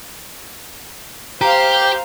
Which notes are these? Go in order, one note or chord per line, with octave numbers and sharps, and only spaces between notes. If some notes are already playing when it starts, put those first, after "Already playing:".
G4 C5 F5 A#5